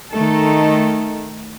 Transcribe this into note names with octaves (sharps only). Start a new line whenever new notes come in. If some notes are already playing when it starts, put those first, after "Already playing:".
D#3 A3 D#4 A4